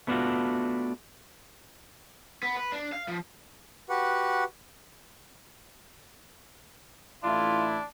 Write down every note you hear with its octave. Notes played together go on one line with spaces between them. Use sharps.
A3 B3 D4 D#4 F4 F#4
B3
B4
D4
F5
F3
F#4 G4 B4 F#5
A1 A3 D4 E4 F4